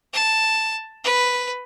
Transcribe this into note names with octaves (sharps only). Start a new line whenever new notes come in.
A5
B4